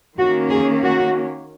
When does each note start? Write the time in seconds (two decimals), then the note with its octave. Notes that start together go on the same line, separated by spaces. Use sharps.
0.19 D#3 A#3 C#4 F#4
0.50 G#4
0.83 F#4